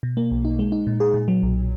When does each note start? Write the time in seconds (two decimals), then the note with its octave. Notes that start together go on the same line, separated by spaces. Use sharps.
0.03 B2
0.17 A#3
0.31 B1
0.45 D#4
0.59 G#3
0.72 D#4
0.87 A#2
1.00 G#4
1.14 A#2
1.28 F#3
1.43 B1